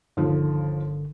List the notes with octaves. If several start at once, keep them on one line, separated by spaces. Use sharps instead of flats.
G1 D#2 D3 F3